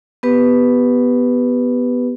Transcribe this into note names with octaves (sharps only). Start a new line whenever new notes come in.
B3 G4 B4